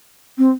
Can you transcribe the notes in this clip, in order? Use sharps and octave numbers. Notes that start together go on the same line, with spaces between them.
C4